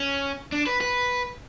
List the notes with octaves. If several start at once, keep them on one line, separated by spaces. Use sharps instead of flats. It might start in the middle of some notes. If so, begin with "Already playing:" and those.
Already playing: C#4
D4
B4
B4